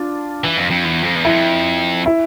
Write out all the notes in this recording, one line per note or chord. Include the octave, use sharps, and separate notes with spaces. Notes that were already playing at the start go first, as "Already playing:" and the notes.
Already playing: D4 F4
E3
F2
F2
E2
F2
E2
F2 E4
E4